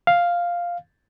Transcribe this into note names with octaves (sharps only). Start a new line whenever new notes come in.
F5